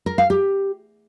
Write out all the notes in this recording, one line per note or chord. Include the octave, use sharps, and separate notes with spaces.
A#4
F5
G4